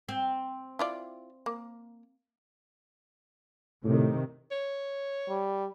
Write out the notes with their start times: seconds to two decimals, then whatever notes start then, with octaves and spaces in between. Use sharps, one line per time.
0.09 C4
0.79 E4 F4 D5
1.46 A#3
3.84 A2 C3 D#3
4.51 C#5
5.29 G3